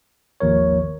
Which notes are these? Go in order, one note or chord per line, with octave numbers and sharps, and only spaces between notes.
G#1 D#2 F3 A#4 C#5